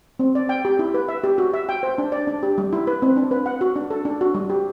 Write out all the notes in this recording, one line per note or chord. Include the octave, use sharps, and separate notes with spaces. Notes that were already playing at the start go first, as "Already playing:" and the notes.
C4
D5
G5
G4
E4
B4
E5
G4
F#4
E5
G5
C5
D4
D5
D4
G4
G3
E4
B4
C4
D4
B4
F#5
F#4
D4
A4
D4
F#4
G3
G4